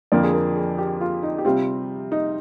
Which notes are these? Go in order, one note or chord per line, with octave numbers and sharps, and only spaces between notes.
F2 D3 F3 A#3 D5
G#4
A#4
G#4
G4
F4
D#4
G4
C3 G3 C4 F4
D#4